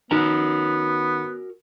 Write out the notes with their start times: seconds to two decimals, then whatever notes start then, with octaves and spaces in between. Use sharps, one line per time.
0.11 D#3 B3 F#4 A#4 A#5